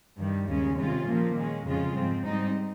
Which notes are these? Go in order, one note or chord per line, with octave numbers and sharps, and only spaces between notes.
G2 D#3 G3
D#2 C#3 G#3 C#4
C3 D#3 G#3 C#4 F4
A#2 F3 A#3
D#3 G#3 C#4
F2 C#3 G#3 C#4 F4
G#2 F3 C4
G#2 G3 C4 D#4